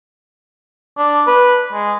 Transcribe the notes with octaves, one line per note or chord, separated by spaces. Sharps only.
D4
B4
G#3